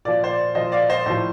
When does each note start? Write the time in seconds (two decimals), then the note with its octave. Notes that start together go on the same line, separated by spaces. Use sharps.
0.05 A#2 F3 D5
0.24 C5
0.30 D5
0.55 A#2 F3 C5 D#5
0.72 D5 F5
0.89 C5 D#5
1.06 A2 F3 C5